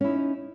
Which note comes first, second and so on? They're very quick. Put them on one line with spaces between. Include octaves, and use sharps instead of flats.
C#4 E4 D#4